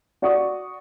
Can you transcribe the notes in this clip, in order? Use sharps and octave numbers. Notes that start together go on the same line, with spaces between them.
F#4 D5 F#5 C#6 D#6